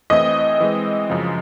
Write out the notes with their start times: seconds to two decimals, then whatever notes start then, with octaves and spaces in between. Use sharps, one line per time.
0.10 E3 A3 C4 E4 D#5
0.60 E3 G#3 C4
1.10 F#2 C#3 F3